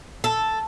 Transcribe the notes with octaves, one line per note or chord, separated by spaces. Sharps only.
A4